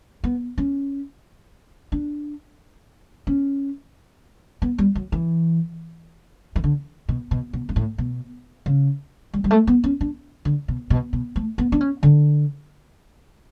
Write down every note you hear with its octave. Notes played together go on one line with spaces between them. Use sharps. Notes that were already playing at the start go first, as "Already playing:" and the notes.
B3
C#4
D4
C#4
B3
G3
F#3
E3
E3
D3
B2
B2
B2
G2
A2
B2
C#3
G3
G3
A3
B3
C#4
D4
D3
B2
B2
B2
A3
B3
D4
C#4
D3